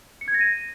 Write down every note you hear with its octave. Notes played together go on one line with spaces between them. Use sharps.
C#7
G#6
A#6
D#7